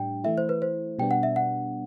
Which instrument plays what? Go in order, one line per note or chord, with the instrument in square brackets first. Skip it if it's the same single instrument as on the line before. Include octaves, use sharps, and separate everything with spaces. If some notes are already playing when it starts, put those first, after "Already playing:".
Already playing: [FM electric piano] A2 G3 D4 [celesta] G5
[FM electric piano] E3 A3 E4 [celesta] E5
[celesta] C5
B4
C5
[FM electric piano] B2 G3 B3 D4 [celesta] G5
[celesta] F#5
E5
F#5